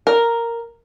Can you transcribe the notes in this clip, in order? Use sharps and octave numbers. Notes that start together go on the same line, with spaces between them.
A#4